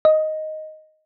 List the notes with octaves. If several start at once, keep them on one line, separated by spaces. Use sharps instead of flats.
D#5